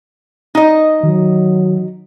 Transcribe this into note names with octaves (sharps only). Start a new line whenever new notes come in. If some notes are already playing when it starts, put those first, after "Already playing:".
D#4 D#5
D#3 F#3